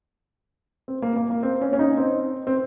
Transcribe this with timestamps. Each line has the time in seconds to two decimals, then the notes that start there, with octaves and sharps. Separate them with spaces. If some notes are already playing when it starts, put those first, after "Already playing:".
0.88 C4
1.02 A#3
1.16 A#3
1.30 A#3
1.43 C4
1.61 C#4
1.73 C#4
1.79 D#4
1.97 C4
2.47 C4